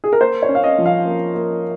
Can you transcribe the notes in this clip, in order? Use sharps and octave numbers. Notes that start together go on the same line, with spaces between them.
G#4
A#4
A#3 C5
C#5
C#4
F5
D#5
F3
F5
A#3
A#3